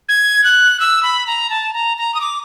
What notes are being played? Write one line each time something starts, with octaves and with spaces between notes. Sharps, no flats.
G#6
F#6
E6
B5
A#5
A5
A#5
A#5
D#6
D6